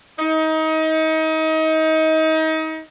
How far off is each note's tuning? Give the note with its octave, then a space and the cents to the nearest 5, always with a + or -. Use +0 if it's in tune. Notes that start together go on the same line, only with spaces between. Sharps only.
D#4 +30